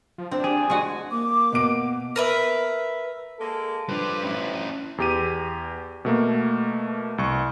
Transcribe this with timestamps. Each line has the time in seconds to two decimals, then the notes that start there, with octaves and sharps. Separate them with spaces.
0.18 F3
0.31 C4 D4
0.44 G4 G#4
0.70 G#3 F#4
1.11 A#3 D6
1.52 B2 D7
2.16 A#4 B4 E5
3.39 G#3 A#3 A4
3.89 F3 G3 D4 F4 B4
4.25 C#4 E4
4.98 E2 G4 D#7
6.05 B2 A3 A#3
7.18 C2 C#6